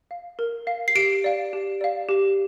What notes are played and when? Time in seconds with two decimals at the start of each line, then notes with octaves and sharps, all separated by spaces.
0.11 F5
0.39 A#4
0.67 F5
0.88 C7
0.95 G4 D7
1.24 D5 F5
1.53 G4
1.81 D5 F5
2.09 G4